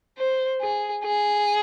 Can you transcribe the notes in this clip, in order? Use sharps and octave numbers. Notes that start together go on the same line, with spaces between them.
C5
G#4
G#4